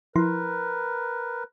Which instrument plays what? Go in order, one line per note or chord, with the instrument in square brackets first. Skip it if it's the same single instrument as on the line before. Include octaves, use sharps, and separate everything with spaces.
[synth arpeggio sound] F3 E4 C6 [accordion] A#4 B4